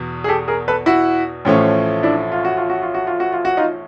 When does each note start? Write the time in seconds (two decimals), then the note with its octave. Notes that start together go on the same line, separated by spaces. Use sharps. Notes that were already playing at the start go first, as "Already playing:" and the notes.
Already playing: E2 B2
0.24 G#4
0.28 G4 A4
0.48 G#4 A#4
0.68 A4 B4
0.86 E4 F#4
1.45 A1 A2 F3 A3 C#4
2.03 D4 E4
2.32 F4
2.45 F#4
2.57 F4
2.70 F#4
2.83 F4
2.94 F#4
3.07 F4
3.20 F#4
3.33 F4
3.45 F#4
3.57 D#4 F4